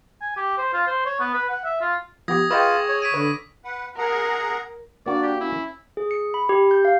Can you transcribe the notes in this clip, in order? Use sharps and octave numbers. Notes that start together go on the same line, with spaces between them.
G#5
G4
C5
F4
C5
C#5
B3
B4
F#5
E5
F4
F3 B3 G4 D#6 G#6 A#6
F4 G#4 B4 D#5 G5 C#6 D6 E6
C#5
B6 D7 D#7
D3 B4
B4 F#5
G#4 A#4 F#5 A#5
A#3 D4 F#4 D5
G4
C#4 E4
G#4
C#7
B5
G4
G6
F5